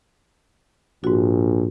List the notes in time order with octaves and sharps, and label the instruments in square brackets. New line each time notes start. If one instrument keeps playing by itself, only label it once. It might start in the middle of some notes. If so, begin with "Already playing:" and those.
[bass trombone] A#1 [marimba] G#2 F#4